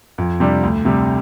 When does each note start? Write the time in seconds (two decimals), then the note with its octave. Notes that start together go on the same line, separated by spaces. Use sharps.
0.18 F2
0.40 C3 G3 D4
0.63 D2
0.85 C3 G3